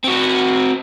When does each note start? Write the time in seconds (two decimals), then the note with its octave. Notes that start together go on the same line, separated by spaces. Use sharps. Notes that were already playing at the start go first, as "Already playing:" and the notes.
0.04 C4 F#4